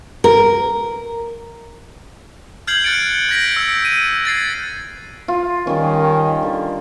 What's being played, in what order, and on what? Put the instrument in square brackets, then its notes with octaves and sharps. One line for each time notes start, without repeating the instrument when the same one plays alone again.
[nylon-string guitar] A#4
[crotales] F6 G6 G#6 C7 F#7
F#6 G#6 A6 C#7 D7
G6 G#6 A#6 B6 D7
E6
D#7
G#6 A6 C7
[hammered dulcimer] F4
[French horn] D#3 [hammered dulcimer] G3 C#4
[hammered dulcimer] D3